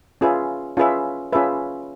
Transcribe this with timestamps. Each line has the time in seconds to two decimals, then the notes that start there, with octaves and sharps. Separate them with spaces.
0.21 C#4 F4 G#4 B4 E5
0.77 C#4 F4 G#4 B4 E5
1.33 C#4 F4 G#4 B4 E5